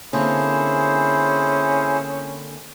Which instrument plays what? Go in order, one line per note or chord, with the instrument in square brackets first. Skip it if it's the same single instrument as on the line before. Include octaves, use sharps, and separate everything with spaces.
[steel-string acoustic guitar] D3 A#3 C4 [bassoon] C#4 [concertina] E4 G#4 C5